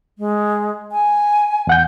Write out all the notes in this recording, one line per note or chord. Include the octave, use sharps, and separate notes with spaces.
G#3
G#5
E2 F#5 G6